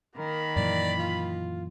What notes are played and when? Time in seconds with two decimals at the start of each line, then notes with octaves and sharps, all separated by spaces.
0.16 D#3 A#3 A#4 B5
0.56 F#2 A#2 E3 D5
0.99 F4